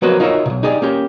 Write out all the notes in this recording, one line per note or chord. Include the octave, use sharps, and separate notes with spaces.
F3 F#3 A#3 F#4 B4 D#5
D#4 F4 F#4 A#4 C#5 E5
B1 B2
D#4 G4 G#4 D5
A#3 C#4 G4